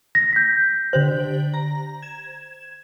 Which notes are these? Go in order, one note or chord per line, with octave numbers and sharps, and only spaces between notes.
A#6
G6 B6
D3 G4 C5 F#7
A#5
G#6 E7